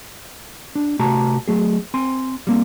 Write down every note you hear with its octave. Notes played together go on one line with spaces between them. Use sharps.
D4
C3 A3 F#4 G4 A5 A#5
F#3 A3 G#4
C4 G#5 C6
G3 A#3 C4